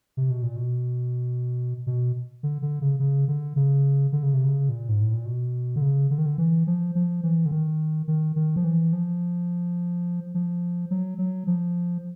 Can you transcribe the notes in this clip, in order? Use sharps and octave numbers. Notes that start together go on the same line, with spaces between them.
C3
B2
A#2
B2
B2
D3
D3
C#3
C#3
D3
C#3
D3
C#3
C3
C#3
A#2
G#2
A2
A#2
B2
D3
C#3
D3
D#3
D3
E3
F3
F3
E3
D3
D#3
D#3
D#3
F3
E3
F3
F3
F#3
F#3
F3